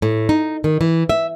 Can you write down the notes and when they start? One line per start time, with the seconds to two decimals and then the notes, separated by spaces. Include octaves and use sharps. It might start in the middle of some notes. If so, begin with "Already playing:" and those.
0.02 A2
0.29 D#4
0.64 D#3
0.81 E3
1.09 E5